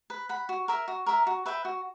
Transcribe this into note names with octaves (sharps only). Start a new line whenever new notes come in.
B4
F#5 B5
F#4
A#4 E5 A#5
F#4
A#4 E5 A#5
F#4
B4 E5 G5
F#4